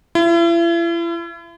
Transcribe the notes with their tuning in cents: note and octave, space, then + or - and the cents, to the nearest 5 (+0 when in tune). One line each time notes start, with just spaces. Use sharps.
E4 +40